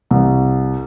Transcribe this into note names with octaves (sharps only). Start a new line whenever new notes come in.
C2